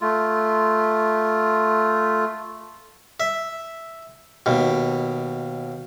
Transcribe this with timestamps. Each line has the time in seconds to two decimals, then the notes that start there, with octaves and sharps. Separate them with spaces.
0.01 A3 F4
3.20 E5
4.46 D#2 B2